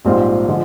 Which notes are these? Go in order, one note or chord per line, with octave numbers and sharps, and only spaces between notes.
A#1 G#2 G3 C4 F4
D3 F3 G#3